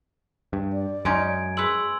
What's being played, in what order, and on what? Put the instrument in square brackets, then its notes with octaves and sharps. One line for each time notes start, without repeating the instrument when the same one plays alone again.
[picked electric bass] G2
[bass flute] D5
[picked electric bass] F#2 [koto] G#3 C#4 D#4 [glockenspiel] G#5 G#6 D7
[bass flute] G#4 [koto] B4 C#5 [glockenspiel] C6 E6 F#7